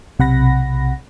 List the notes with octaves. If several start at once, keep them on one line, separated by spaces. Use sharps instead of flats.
B1 C3 F#5 B5 A#6